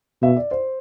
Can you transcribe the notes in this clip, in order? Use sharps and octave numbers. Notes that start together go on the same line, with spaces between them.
B2 E5
D5
C5